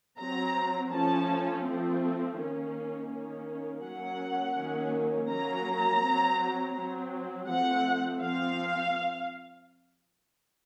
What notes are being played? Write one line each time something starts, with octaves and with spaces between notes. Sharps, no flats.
F#3 C4 A#5
F3 A3 C#4 A5
F3 A3 C4
D#3 A#3 C#4
D#3 A#3 C#4
F#3 A#3 C#4 F#5
D#3 F#3 A#3 C#4
F#3 A#3 C#4 A#5
F#3 C4
F#3 C4
F3 A3 C4 F#5
F3 C4 F5